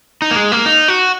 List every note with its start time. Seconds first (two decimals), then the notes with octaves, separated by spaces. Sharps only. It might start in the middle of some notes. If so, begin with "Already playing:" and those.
0.22 D#4
0.31 A#3
0.36 G#3
0.52 A#3
0.66 D#4
0.88 F#4